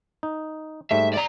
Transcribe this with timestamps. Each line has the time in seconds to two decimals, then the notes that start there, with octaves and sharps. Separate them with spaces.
0.23 D#4
0.91 G#2 G3 A3 E5
1.13 D5 A#5